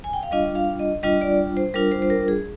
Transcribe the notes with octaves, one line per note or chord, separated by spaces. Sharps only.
G#5
G5
F5
G3 D4 F4 D#5
F5
D#5
G3 D4 F4 D#5
D5
C5
G3 D4 F4 A#4
C5
C5
A#4
G#4